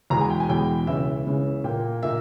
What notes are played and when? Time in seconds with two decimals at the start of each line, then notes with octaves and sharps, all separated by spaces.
0.10 E2 B2 G#3 A#5
0.21 G#5
0.30 G5
0.40 G#5
0.49 E2 B2 G#3 G5
0.87 C#2 C#3 E3 E5
1.26 C#2 C#3 E3
1.64 A#2 A#3 G5
2.03 A#2 A#3 E5